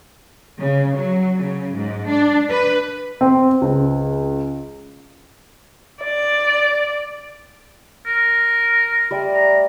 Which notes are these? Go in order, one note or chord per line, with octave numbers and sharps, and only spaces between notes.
C#3
F#3
C#3
G#2
D4
B4
C4
C#2
D5
A#4
G3 A3 D5
A#5